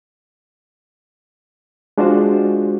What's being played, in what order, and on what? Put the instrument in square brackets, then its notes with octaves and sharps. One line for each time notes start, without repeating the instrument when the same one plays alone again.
[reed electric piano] G#3 D4 F4 F#4 C5